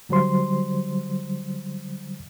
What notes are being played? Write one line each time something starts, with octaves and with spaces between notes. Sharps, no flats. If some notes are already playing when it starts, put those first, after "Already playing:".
D3 F#3 G3 C5 C6